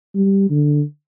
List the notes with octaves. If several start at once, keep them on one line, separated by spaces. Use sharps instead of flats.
G3
D3